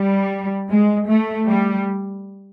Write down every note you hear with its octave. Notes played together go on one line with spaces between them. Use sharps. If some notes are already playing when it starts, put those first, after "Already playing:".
Already playing: G3
G#3
A3
G3